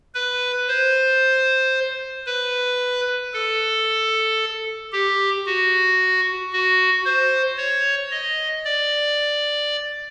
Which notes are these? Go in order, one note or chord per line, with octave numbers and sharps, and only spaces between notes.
B4
C5
B4
A4
G4
F#4
F#4
C5
C#5
D#5
D5